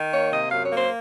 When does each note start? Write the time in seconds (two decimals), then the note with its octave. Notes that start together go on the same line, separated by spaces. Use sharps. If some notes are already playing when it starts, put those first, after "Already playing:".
Already playing: D#3
0.12 A#3 C#5
0.32 C3 D#5
0.51 F#2 F5
0.64 C#5
0.72 A#3
0.77 C5